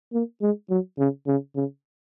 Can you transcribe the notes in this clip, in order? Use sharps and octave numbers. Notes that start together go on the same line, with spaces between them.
A#3
G#3
F#3
C#3
C#3
C#3